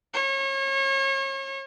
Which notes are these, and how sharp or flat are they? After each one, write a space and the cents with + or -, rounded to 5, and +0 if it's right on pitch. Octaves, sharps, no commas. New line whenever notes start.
C#5 -35